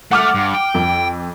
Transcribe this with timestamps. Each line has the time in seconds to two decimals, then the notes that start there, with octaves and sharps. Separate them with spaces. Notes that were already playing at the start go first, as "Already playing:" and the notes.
0.11 A3 F#5 D6 F6
0.35 G2
0.54 G5
0.74 F2